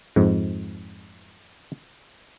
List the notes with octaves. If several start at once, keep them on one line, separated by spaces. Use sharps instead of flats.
F2 G#2